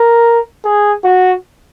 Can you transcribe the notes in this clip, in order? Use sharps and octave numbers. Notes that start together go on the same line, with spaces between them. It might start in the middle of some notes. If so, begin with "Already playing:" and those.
Already playing: A#4
G#4
F#4